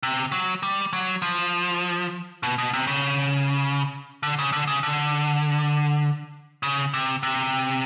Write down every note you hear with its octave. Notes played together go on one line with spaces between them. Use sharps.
C3
F#3
G3
F#3
F3
B2
B2
C3
C#3
D3
C#3
D3
C#3
D3
C#3
C3
C3